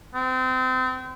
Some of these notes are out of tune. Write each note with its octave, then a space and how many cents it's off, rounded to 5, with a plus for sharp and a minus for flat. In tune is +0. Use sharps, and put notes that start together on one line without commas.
C4 -30